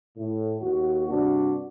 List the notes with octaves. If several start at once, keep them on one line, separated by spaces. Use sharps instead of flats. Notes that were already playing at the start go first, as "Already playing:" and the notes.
A2
D#2 F#4
G2 C3 D4 F#4